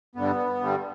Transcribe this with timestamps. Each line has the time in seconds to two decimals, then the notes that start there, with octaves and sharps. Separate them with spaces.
0.15 G2 D3 G3 B3
0.60 G2 D3 G3